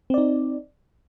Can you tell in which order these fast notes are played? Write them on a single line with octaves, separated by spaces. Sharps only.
C4 D5 D#4